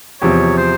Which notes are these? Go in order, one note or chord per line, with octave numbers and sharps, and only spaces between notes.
E2 C3 F3 C#5
C5